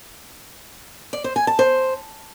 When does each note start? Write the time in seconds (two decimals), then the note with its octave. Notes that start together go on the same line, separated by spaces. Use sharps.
1.13 D5
1.24 C5
1.36 G#5
1.47 A5
1.59 C5